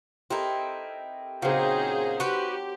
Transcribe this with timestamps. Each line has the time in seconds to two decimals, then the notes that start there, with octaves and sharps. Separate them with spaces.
0.30 C4 D#4 E4 G4 A4 A#4
1.42 A#2 C#3 F#3 C4 D#4 G#4 C5
2.20 F#4 G4 B4 C6